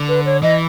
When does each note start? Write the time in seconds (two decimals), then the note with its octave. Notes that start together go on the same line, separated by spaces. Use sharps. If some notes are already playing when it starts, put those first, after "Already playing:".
Already playing: D3
0.09 B4
0.25 C#5
0.43 E3 D#5